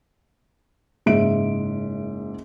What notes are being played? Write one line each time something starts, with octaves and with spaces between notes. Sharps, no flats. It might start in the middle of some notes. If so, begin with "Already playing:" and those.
F#1 G#2 E5 D7